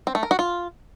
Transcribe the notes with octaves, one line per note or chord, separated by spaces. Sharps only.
C4
A3
A#4
F#4
F4